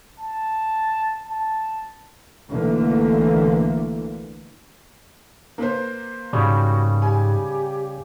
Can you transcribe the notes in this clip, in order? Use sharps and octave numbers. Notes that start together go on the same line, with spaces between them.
A5
A5
B1 D3 E3 A3 A#3
A#3 B4 C5
G#2 C#3 G3 F#4
G4 G#5